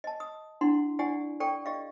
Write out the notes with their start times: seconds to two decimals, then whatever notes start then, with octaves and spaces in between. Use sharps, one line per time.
0.04 D#5 A5
0.20 D#6
0.61 D4 E4 F#5 C6
0.99 E4 G4 D5 F#5 G#5
1.40 A4 D5 G5 C#6
1.66 G4 D5 D#5 F5